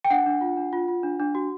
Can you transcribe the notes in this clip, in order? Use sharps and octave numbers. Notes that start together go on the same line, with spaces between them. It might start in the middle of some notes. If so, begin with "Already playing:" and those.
G5
D4 F#5
D4
F4
D4
F4
F4
D4
D4
F#4